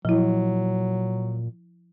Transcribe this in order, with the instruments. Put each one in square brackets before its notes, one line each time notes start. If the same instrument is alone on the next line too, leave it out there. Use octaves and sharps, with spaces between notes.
[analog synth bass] A#2 [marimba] F3 E4 [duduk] F#3